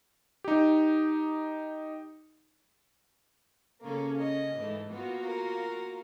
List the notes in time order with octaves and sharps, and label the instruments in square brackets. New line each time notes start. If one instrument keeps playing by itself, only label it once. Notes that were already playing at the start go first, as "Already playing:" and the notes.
[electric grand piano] D#4 G4
[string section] C#3 C#4 [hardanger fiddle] A#3 A4
[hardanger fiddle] D#5
[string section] G#2 E3 A3
[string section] A#3 F4 F#4 [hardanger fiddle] B3
[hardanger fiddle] A#4